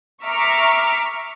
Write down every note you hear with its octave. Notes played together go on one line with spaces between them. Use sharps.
E5 A#5 C#6 D6 F6 B6